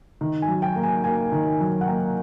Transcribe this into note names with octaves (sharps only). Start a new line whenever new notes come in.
D#3
G#5
F#3
G5
A#3
G#5
A#3 G#5
D#3
F#3
F#5
A#3 G5